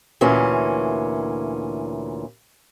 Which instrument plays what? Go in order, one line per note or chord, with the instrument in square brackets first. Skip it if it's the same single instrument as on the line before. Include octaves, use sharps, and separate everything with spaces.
[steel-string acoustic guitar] D2 A#2 E3 C#4